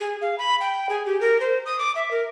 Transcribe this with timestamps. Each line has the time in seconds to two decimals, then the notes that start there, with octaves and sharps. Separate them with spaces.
0.01 G#4
0.21 F5
0.38 B5
0.61 G5
0.89 G#4
1.06 G4
1.21 A#4
1.40 C5
1.66 D#6
1.79 D6
1.96 E5
2.11 A#4